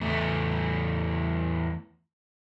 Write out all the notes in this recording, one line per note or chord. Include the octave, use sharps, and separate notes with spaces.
E2 A3